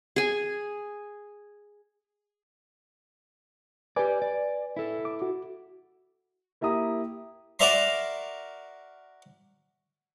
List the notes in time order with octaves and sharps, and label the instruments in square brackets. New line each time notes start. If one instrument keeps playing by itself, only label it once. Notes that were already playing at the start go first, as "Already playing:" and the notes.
[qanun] G#4 G#5
[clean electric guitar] G4 D5 [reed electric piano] B4 G#5 D6
[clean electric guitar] D5
E4 A4
[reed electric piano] D6
F#4
[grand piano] A#3 E4 G4 A#5 D#6
[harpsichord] F#4 A#4 D5 E5 A#5 C6